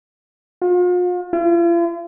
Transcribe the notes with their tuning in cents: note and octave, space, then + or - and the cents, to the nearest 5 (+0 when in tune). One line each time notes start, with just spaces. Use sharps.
F4 +40
F4 -45